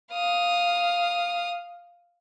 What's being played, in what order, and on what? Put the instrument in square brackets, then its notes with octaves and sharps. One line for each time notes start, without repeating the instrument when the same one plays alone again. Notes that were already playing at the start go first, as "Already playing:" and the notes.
[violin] F5 D#6